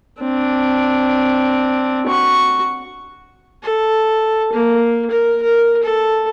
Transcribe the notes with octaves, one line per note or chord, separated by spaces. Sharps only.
C4 D4
F#4 C#6
A4
A#3
A#4
A#4
A4